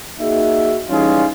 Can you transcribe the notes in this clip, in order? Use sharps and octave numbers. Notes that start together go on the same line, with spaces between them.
A#3 D#4 F#4 G#4 E5
E3 G3 C#4 D#4 F4 G#4